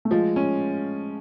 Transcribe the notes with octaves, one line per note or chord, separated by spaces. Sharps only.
A3
F3 G#3
C#4